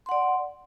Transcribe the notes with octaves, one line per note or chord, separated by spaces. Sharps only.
D5 F#5 C6